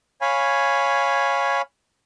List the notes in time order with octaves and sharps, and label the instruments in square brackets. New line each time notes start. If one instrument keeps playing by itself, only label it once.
[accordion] C#5 F5 G#5 B5